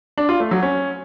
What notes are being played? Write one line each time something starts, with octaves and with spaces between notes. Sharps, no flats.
D4
F4
A3
F#3
C#4